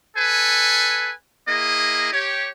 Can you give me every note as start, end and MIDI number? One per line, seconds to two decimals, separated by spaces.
0.16 1.11 69
0.16 1.11 71
0.16 1.11 80
1.48 2.11 58
1.48 2.11 64
1.48 2.11 68
1.48 2.11 75
2.12 2.48 67
2.12 2.48 73